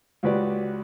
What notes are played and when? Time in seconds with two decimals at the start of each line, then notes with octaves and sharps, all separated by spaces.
0.23 C#2 F#4 G4 B4 D5